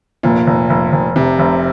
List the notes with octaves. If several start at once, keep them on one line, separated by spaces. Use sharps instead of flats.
F1 A#2
F1
F1
F1
F1 C3
F1